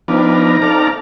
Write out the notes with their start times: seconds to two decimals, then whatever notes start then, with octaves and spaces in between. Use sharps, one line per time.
0.08 F3 B3 C4 D4 D#4 A#5
0.62 A4 D5 F5